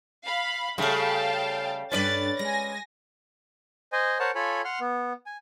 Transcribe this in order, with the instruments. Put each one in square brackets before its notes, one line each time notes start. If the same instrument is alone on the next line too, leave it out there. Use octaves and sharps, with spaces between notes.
[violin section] F5 B5
[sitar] C#3 G3 A3 [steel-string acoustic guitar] A4 C5 [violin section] F5 G5 A5
[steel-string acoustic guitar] G2 D4 A4 [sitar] C#4 B4 D5 [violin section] A6
[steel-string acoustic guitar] G#3 [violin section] G#5 A#6
[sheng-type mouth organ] C5 D#5 G#5
A#4 C5 C#5 F#5 A5
F4 A4 C#5 G#5 B5
F#5 C6 F6
B3
G#5